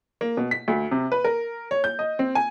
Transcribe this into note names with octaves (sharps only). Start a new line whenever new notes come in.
A#3
B2
B6
D2
C3
B4
A#4
C#5
G6
D#5
C4
G#5